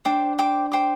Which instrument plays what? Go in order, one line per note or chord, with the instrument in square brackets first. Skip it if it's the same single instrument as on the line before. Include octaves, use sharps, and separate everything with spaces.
[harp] D4 [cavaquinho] C5 G5 D6
[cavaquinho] C5 G5 D6
C5 G5 D6